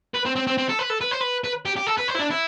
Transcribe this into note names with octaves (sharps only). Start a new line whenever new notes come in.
B4
C4
C4
C4
C4
A4
B4
A4
B4
C5
B4
B4
G4
G4
A4
B4
C5
E4
D4
E4